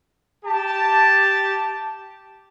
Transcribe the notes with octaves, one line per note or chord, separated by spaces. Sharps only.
G4 A5